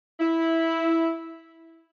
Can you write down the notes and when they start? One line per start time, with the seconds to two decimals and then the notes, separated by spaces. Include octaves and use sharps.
0.20 E4